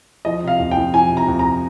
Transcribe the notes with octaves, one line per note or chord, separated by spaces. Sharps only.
F3 D#5
C3 F5
F2
G5
F2
F3 G#5
C3
A#5
F2
A#5